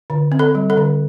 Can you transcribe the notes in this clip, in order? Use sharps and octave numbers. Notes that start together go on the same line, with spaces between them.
D3
C4
A4
G3
A4
D3